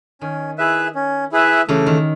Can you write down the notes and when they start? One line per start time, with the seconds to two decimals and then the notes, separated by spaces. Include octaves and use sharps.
0.21 D#3 C#4
0.58 E4 G#4 B4 E5
0.95 C#4
1.32 E4 G#4 B4 E5
1.68 C#3 E3 A3
1.86 D#3